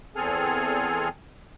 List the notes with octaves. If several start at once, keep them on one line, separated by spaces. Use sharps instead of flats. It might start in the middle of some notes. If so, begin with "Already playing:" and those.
E2 C4 G#4 A4 G#5 F6